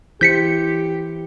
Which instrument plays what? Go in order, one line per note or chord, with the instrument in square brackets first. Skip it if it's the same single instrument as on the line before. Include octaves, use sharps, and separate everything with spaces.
[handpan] E3 E4 C5 [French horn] G4 [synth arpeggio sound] G6 B6 C#7